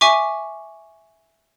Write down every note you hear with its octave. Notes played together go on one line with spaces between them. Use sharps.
E5 G#5 C#6 D6